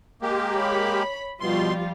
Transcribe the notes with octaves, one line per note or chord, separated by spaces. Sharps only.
G#3 A#3 G4
C#5 B5
B2 F3 G3 F4 C6